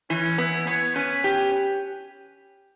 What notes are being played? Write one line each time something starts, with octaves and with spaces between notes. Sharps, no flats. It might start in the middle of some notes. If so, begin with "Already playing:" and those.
E3 C#4
B3 E4
B3 C#5
C#4 B4
G4